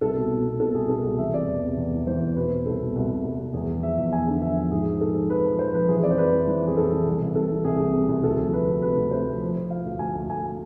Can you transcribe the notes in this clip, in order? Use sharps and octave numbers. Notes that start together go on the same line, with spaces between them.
C2 A4
B2
B2
B2
B2 A4
C2 G#4
B2 A4
C2
E3 E5
C3 D5
E2
C3
E2
E3
E3 C5
E2
B2 B4
B2
C2 A4
B2
C2
C2
C2
C2
E2 G#4
F3
F3 E5
E2 E5
E2 G#5
D3
F3 E5
F3
G#2 G#4
F3
G#2 A4
F3
F3 B4
F3
F3 C5
F3 B4
E3 G#4
F2 D5
C5
F2 B4
E3
E3
F2
G#4
F2 A4
E3
C2
C2
C3 A4
E3
C2 G#4
C2
C3
C2
D2 A4
F3
D2 B4
D2
C3 B4
D2
C3 C5
F3
F3
F3
F3 F5
D2
D2 G#5
D2
D2 G#5